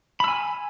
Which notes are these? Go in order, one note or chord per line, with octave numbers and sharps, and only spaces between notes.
G#5 B5 E6